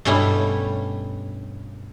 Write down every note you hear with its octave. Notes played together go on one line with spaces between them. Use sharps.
G2 B2 A3 C#4 E4 G4